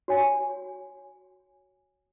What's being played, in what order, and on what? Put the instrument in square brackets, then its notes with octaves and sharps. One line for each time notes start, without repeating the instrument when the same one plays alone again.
[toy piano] F#4 C#5 G#5